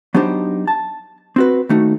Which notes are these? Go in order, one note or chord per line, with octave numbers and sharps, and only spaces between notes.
F#3 B3 D4 D#4 G4 C5
A5
C4 F#4 B4
D#2 A3 D#4 F#4